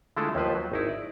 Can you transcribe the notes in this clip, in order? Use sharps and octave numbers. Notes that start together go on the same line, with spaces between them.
D3 G#3 A3 E4 F4 A4
D#2 F3 B4 C5
F#3
G#1 D#4 E4
D5